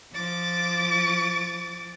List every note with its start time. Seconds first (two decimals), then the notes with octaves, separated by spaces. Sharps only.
0.14 F3 D6 A6